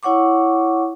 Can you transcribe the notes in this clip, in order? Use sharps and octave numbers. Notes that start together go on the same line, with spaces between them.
E4 C#5 F#5 C#6 D6